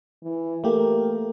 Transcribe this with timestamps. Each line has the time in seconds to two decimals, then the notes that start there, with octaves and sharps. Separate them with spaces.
0.23 E3
0.64 A3 A#3 G4 A#4